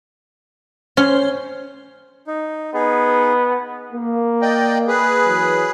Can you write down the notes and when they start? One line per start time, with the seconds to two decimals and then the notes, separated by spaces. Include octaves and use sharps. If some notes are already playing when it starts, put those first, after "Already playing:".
0.97 C#4 C5
2.27 D#4
2.74 B3 D#4 G#4
3.93 A#3
4.42 D5 D#5 G5
4.88 G#4 B4
5.26 E3 F#3